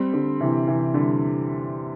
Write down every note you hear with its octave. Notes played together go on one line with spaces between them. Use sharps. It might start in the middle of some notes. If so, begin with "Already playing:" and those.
Already playing: G3 C4
D3 G3
C3 E3
C3 E3
D3 G3